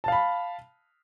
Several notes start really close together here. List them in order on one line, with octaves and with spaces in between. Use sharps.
A5 F5 B5